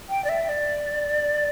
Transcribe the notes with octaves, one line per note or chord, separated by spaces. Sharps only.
G5
D5
E5
D5